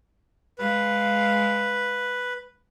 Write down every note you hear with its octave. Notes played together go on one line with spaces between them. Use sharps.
G#3 B4 F5